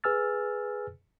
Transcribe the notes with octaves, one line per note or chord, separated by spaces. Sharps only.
G#4 B4 G#5 E6 F6 A6